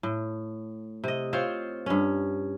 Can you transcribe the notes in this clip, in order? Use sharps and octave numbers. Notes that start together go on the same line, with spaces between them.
A2
C3 D#5
C4 F4 C5 C#5
G2 C#4